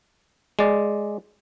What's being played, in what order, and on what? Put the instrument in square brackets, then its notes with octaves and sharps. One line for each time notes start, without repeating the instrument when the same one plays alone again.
[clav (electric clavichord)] G#3 D5